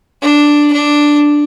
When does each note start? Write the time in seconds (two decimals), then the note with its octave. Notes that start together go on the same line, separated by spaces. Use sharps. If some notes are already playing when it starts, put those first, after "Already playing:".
0.22 D4
0.73 D4